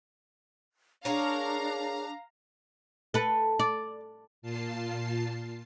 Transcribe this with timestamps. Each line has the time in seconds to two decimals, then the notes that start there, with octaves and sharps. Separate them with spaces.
1.05 D4 G#4 A#4 C#5 F5 A#5
3.14 A4 B4
3.59 D5
4.42 A#2 F4 A5 C7